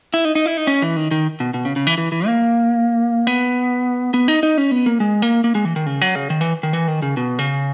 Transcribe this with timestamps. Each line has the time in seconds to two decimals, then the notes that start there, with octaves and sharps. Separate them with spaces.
0.14 E4
0.25 D#4
0.35 D#4
0.46 E4
0.57 D#4
0.67 C#4
0.82 E3
0.96 D#3
1.11 D#3
1.40 B2
1.54 B2
1.65 C#3
1.76 C#3
1.87 E3
1.98 E3
2.12 E3
2.27 A#3
3.27 B3
4.14 B3
4.28 D#4
4.43 D#4
4.58 C#4
4.71 B3
4.86 A#3
5.00 G#3
5.22 A#3
5.44 A#3
5.55 G#3
5.65 E3
5.76 D#3
5.86 C#3
6.01 F#3
6.15 C#3
6.30 D#3
6.41 E3
6.63 D#3
6.73 E3
6.88 D#3
7.02 C#3
7.17 B2
7.39 C#3